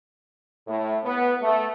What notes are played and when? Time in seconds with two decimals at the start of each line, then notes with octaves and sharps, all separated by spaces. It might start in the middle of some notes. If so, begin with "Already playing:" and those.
0.67 A2
1.04 B3
1.42 A3